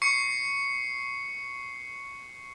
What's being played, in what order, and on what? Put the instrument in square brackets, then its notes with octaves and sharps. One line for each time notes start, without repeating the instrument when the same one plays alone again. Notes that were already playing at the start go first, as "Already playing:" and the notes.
[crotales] C#6 C7 C#7